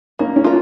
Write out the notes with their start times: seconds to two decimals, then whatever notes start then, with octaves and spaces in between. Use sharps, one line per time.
0.19 A#3 C#4
0.36 C#4
0.44 F4 A#4